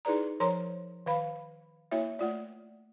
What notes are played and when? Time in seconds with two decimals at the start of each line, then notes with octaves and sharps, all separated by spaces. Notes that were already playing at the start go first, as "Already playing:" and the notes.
0.05 D#4 E4 G#4 B4 D5 A#5
0.40 F3 A#4 C5 C#5 A#5 C6
1.06 D#3 B4 F5 B5
1.91 A#3 E4 F#4 C#5 E5
2.19 A3 F4 D5